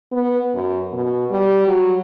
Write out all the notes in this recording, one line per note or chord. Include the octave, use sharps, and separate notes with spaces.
B3
F#2
B2
G3
F#3